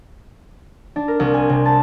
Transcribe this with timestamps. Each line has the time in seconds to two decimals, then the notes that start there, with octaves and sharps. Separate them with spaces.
0.96 D4
1.08 A#4
1.20 C2
1.34 G#5
1.49 C3
1.65 A5